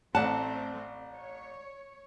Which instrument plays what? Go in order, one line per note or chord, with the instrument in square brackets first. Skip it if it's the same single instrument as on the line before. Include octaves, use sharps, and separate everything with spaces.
[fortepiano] A1 F#5 [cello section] A3 C4 [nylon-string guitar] D5 A5
[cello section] C#5